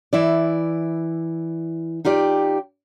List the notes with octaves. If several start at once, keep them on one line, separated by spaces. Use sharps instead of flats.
E3 E4 D5
D#4 F4 G4 D5